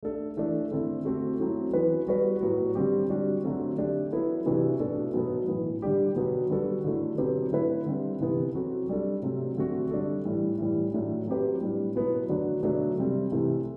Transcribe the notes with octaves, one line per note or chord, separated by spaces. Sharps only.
A3 D4 A4
E3 A3 D4 A4
D3 A3 C4 E4 A4
A3 C4 F#4 A4
F#3 A3 C4 E4
E3 B3 F#4 B4
G3 B3 F#4 B4
A2 F#3 B3 F#4
D3 G3 C4 G4
G3 D4 F#4
D3 F#3 A3 C4
A3 D4 G4
F#3 B3 E4 A4
C3 E3 B3 D4 F#4
B2 A3 D4 A4
B2 F#3 B3
A2 E3 B3
D3 G3 D4 G4
B2 F#3 B3 F#4
D3 G3 B3 F#4 A4
D3 F#3 A3 E4
B2 F#3 C4 G4 B4
D3 A3 E4 B4
D3 G3 C4
C3 E3 B3
F#3 C4 F#4 A4
G3 D4 A4
C3 F#3 A3 C4
D3 A3 C4 F#4
G3 D4 A4
A2 E3 G3
A2 E3 G3
A2 F#3 A3 D4
F#3 C4 G4 B4
A2 G3 D4
B2 F#3 B3 E4
D3 F#3 A3 D4 F#4
B2 F#3 A3 D4
C3 G3 C4
C3 E3 A3